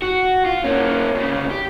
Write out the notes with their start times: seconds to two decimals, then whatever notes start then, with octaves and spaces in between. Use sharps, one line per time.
0.02 F#4
0.45 F4
0.64 A#3 C#4
1.14 D2 C#3
1.50 G4